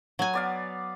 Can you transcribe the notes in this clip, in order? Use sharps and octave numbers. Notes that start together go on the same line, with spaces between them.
F#3 G#5
B3 D5 F5